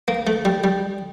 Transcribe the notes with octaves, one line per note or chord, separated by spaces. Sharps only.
A#3
A3
G3
G3